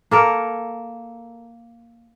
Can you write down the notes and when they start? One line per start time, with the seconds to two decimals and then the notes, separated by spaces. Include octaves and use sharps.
0.11 A#3 A4 A#4